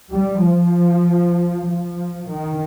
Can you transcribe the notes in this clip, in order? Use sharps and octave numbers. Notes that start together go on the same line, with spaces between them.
G3
F3
F3
D#3